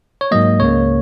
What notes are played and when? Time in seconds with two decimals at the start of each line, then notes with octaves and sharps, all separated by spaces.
0.21 C#5
0.31 G#2 F#3 A#3 D#5
0.60 C#2 C#3 A#3 C#5